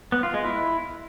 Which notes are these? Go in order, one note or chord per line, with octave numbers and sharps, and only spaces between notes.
B3
F4
G#3
E4